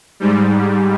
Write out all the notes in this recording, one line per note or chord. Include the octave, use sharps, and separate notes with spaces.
G#2 G3